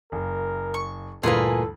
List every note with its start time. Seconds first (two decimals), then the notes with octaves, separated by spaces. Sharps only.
0.12 F#1 A#4
0.74 C#6
1.23 D2 G2 A#2 E3 A#3 G#4 A4 B4